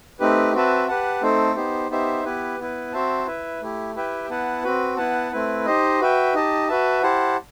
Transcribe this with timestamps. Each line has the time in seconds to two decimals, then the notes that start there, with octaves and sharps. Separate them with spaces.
0.20 A3 C4 D#4 G4 B4
0.53 C4 F#4 B4 E5 A5
0.88 G4 B4 F#5 A5
1.22 A3 C4 D#4 A4 C5
1.56 B3 D#4 G4 C5
1.90 B3 D#4 G4 C5 E5
2.25 B3 E4 G4 B4
2.59 B3 E4 B4
2.93 C4 F#4 C5 E5 A5
3.26 E4 B4 E5
3.61 A3 E4 G4
3.95 E4 G4 B4 E5 G5
4.30 B3 E4 B4 F#5 A5
4.64 C4 F#4 B4
4.97 B3 E4 B4 F#5 A5
5.31 A3 C4 E4 B4
5.66 D#4 G4 C5 D#5
6.00 F#4 B4 E5 G5
6.34 D#4 G4 D#5 A5
6.68 F#4 B4 E5 A5
7.03 E4 G4 C5 F#5 A5